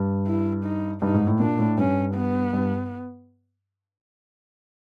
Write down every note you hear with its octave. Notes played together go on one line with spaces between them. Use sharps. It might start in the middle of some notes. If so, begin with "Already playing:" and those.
Already playing: G2
E4
D#4
G2 D#4
G#2
A2
A#2 D4
A2
G2 C#4
B3
G2